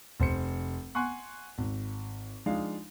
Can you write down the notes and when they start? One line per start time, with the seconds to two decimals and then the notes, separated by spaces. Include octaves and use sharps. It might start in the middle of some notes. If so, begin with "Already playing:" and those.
0.20 F1 C5 C#7
0.95 F#5 G#5 C6 C#6 F#6
1.58 G#1
2.46 F3 G#3 D4 D#4 F5